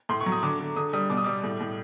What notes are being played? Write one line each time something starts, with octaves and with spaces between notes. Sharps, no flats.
A2 C6
C#6
F#3
D#6
D3 D6
D3
D3 D#6
G3 D#6
B2 D6
D#6
G3 D6
A2
A2